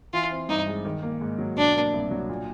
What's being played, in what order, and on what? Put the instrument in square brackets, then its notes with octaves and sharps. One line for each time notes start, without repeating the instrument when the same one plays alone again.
[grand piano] E3 [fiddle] F4
[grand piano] C4
[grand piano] G2 [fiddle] D#4
[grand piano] G#3
D#3
A#3
G#2
F#3
[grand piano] B2 [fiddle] D4
[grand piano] A#3
C2
F#3
A#2